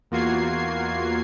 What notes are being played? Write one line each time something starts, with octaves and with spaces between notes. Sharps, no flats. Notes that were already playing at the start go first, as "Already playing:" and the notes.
E2 A#3 F4 F#4 G#6 C7